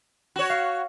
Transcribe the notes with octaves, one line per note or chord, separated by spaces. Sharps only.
F#4 C#5
F5